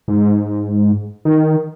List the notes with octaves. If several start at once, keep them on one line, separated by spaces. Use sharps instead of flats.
G#2
D#3